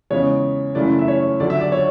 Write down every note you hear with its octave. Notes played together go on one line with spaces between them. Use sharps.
E2 C#3 G#3 C#5
F#2 C#3 E3 A3 D5
E5
C#5
D2 D3 F#3 D5
E5
D5
C#5